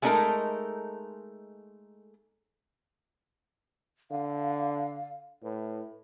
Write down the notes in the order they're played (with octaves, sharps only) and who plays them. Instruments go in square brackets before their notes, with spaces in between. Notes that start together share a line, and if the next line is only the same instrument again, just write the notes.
[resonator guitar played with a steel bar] G#3 A3 D4 D#4 A4 A#4
[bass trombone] D3 [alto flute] F5
[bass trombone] A2 [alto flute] B4